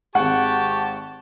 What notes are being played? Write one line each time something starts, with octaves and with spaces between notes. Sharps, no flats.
G#1 G#3 G4 F#5 A5 C#6